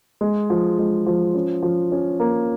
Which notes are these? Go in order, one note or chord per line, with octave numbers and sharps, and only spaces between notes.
G#3
F3
G#3
F3
C#4
F3
C#4
A#3